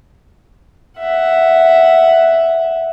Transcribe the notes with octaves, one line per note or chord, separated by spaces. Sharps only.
E5 F#5